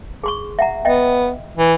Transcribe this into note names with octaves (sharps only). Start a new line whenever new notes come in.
G#4 C6 C#6
E5 F#5 A#5
B3 D#5 E5 G5
E3